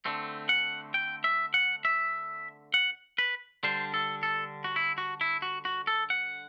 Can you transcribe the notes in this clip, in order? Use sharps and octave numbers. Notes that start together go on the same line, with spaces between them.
D3 A3 C4
F#5
G5
E5
F#5
E5
F#5
B4
D3 G3 D4 C5
A4
A4
F#4
E4
F#4
E4
F#4
F#4
A4
F#5